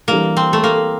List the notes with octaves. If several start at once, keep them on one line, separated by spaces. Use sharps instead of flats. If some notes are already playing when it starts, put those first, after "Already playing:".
E3 G3 A#3 D4 G4
C4
A3
A#3